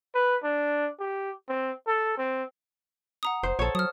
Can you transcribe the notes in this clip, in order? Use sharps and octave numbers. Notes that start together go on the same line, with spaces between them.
B4
D4
G4
C4
A4
C4
F#5 A#5 D#6
F1 C5
A#1 A4 C#5
F#3 D#6 F6